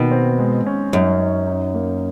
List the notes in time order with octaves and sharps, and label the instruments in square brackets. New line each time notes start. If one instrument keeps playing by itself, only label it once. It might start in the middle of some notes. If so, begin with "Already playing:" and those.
Already playing: [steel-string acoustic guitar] B2 [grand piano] D#3 A#3
[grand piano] C4
G#3
C#4
[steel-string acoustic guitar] F#2 [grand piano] D#4
[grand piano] D#4
D#4
A#3